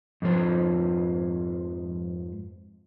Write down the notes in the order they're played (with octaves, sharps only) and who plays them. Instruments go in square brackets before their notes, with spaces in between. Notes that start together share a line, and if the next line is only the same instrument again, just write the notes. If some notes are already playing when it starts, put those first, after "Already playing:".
[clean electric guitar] F2 G#2 F3 C5